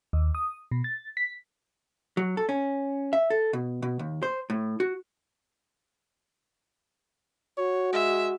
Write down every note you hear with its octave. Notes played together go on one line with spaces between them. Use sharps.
D#2
D#6
B2
A6
B6
F#3
A4
C#4
E5
A4
B2
B2
D#2
C5
A2
F#4
F#4 C#5
G#3 E5